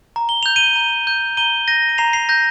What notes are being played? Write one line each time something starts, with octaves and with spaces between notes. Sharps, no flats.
A#5
G7
G6 F7
D#7 G7
A#5
G6
A#5 D#7 G7
G6 A#6 D#7
D#7
A#5 C7 F7
C7 F7
G6 A#6